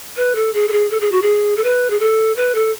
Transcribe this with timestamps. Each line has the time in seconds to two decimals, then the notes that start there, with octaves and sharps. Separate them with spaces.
0.17 B4
0.35 A4
0.54 G#4
0.68 A4
0.72 G#4
0.91 A4
1.00 G#4
1.12 F#4
1.22 G#4
1.57 A4
1.64 B4
1.90 G#4
2.00 A4
2.36 B4
2.55 A4